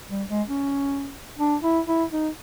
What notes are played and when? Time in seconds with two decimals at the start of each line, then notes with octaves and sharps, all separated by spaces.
0.11 G3
0.30 G#3
0.48 C#4
1.39 D4
1.63 E4
1.87 E4
2.12 D#4